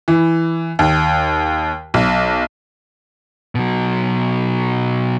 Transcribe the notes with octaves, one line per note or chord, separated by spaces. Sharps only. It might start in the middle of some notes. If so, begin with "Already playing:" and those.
E3
D#2
B1
B2 F#3